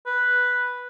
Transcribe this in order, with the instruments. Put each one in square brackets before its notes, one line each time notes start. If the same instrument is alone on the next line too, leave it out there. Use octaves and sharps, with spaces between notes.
[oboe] B4